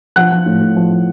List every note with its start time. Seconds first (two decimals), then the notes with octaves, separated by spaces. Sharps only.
0.16 F3 F#5 F#6
0.31 F3
0.46 A2
0.60 A2
0.76 F3
0.91 F3